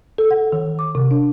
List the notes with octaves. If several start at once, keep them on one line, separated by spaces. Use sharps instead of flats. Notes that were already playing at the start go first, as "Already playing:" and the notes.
A4
F#5
D#3
D6
C3
D4